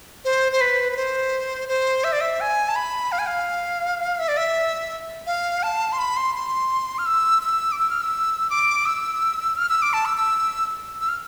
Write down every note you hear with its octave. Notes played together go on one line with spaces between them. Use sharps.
C5
C5
B4
B4
C5
C5
E5
D5
E5
G#5
A5
B5
F5
G#5
F5
E5
D5
E5
F5
A5
C6
B5
C6
C6
F6
E6
E6
D6
E6
F6
E6
D6
E6
F6
E6
D6
A5
E6
E6
E6
F6